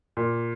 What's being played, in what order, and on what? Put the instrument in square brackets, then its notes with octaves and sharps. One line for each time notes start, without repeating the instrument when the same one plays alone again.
[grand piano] A#2